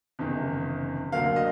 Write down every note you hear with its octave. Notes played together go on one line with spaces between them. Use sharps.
F#1 E2 C3 D#3
D2 D3 F#3 A#3 F5
D#5